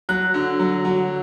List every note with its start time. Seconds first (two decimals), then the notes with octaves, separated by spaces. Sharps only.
0.09 F#3 F#6
0.34 D3
0.59 F#3
0.85 F#3